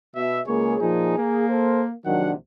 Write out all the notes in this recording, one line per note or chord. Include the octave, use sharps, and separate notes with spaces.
B2 E5
C#2 A#3 G#4 C#5
A#2 F3 D#4
A#3
A4 A#4 C5
A#1 C3 D#3 F#3 D4 F#5